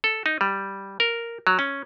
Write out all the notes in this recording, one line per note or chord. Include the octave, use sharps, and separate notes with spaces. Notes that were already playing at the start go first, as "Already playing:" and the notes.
A4
D#4
G3
A#4
F#3
C#4